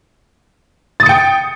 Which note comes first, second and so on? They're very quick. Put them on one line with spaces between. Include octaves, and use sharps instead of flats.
A6 D#6 C#7 G5